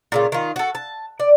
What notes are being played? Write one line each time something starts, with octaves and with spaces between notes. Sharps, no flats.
A#2 C#3 F4
D#3 F4
F#4 A4
A5
D5